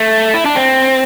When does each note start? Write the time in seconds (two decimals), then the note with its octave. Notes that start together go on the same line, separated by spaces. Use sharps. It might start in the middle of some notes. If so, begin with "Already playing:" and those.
Already playing: A3
0.34 E4
0.45 D4
0.55 C4